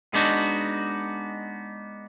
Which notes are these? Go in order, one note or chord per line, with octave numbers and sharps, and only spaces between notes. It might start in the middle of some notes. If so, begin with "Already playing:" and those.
G#3 B3 D4 D#4 F#4